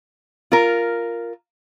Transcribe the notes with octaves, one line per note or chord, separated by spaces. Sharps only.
F4 A#4